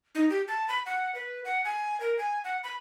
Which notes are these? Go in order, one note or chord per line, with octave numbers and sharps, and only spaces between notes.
D#4
G4
A5
B5
F#5
B4
F#5
G#5
A#4
G#5
F#5
B5